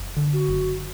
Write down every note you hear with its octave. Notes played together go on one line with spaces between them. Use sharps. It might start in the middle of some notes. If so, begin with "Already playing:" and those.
Already playing: F#1
D3
F#4
F#1